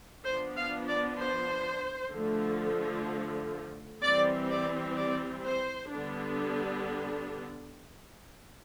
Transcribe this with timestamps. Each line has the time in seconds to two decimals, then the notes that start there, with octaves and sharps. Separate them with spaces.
0.24 F3 B3 D4 C5
0.56 F5
0.88 D5
1.19 C5
2.14 D3 F3 A3
4.02 E3 G3 C4 D5
4.49 D5
4.97 D5
5.44 C5
5.92 D3 G3 B3 D4